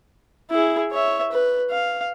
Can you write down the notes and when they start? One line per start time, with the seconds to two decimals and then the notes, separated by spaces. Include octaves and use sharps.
0.51 E4 G#4
0.91 C#5 E5
1.32 B4
1.71 F5